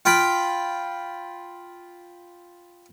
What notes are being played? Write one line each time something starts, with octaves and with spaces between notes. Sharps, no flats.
F4 G5 B5